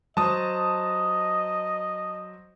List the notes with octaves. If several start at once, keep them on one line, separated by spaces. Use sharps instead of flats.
F#3 C5 D#5 A5 D#6